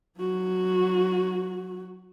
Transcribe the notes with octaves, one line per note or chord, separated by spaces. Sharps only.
F#3 F#4